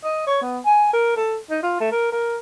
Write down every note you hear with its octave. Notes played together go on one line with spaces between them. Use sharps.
D#5
C#5
B3
G#5
A#4
A4
D#4
F4
A3
A#4
A#4